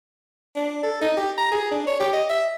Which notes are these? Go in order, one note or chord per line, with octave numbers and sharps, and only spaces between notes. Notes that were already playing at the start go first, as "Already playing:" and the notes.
D4
A4
D#4
G4
A#5
G#4
D4
C#5
G4
D#5
E5